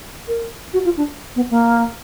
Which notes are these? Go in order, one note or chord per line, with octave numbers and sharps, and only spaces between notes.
A#4
F#4
F4
D4
B3
A#3